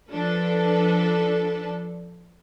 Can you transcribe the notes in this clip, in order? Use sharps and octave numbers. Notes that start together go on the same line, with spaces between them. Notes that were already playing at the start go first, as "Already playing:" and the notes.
F3 D4 A4 B4